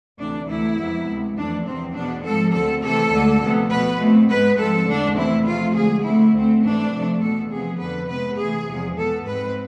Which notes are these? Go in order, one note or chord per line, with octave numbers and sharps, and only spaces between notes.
D2 C3 E3 D4
D2 C3 E3 A3 E4
F2 C3 G#3 B3
D2 C3 G#3
F2 E3 A3 D4
E2 C3 F3 C4
E2 B2 B3 D4
G#2 F3 G#3 C4 A4
D2 D3 A3 C4 A4
C3 E3 A3 C4 A4
D2 D3 G#3
D2 C3 F3 B3
B2 B3 B4
B2 A3 C4
G#2 G#3 B3 B4
G#2 F3 G#3 C4 A4
E2 D3 G#3 D4
E2 C3 E3 A3 C4 E4
C3 F3 A3 C4 F4
D2 D3 G#3 G#4
D2 D3 A3 C4 E4
D2 D3 A3 C4
G#2 E3 A3 C4 D4
C3 F3 A3 C4
E2 B2 B3 A4
C3 F3 B3 G#4
F2 D3 F3 B4
C3 G#3 B3 B4
C3 E3 A3 G#4
E2 C3 F3 G#3
B2 B3 A4
G#2 G#3 C4 B4